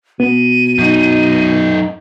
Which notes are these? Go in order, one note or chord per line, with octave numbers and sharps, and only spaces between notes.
B2 B3 D#7
F#2 D#4